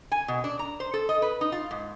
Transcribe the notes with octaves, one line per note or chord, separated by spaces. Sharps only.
G#5
B2
D4
A#5
C5
A4
D#5
B4
D#4
F4
G#2